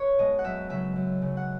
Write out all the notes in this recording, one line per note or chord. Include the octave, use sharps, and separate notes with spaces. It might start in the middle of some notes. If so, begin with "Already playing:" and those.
Already playing: B4 C#5
B2 G#3 D#5
F#5
F#2 E5
C#3 F#3 E5
F#2
C#3 F#3
F#5